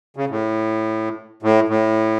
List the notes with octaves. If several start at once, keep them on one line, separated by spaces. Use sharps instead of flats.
C#3
A2
A2
A2